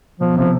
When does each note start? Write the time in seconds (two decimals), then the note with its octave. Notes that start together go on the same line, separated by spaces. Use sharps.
0.20 B2 F3
0.36 C3 F3